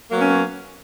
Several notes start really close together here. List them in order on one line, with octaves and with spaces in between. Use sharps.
A#3 F#3 B3 C#4